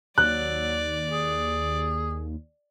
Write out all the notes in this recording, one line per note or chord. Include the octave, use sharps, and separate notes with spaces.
D#2 F#3 D5 F#6
G#4